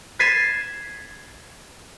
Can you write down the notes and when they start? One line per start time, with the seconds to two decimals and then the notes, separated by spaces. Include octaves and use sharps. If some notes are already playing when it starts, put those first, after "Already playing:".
0.19 G#6 A6 B6 C7 D#7 E7